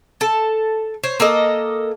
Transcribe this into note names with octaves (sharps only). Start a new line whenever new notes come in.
A4 A5
C5 C#5
A#3 A4 D#5